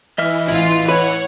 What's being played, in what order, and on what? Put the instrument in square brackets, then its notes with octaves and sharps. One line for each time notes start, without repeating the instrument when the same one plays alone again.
[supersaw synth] E3 [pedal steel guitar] D#5 E5 F6
[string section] A1 F4 [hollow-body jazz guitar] E4
[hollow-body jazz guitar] B4 [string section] C#5 F#5